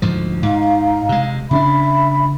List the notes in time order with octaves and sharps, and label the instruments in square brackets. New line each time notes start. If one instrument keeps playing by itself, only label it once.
[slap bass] D2 G#2 F3
[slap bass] G#2 [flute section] D#4 F5
[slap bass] C3 G#3
[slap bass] C#3 C#4 D4 [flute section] E5 B5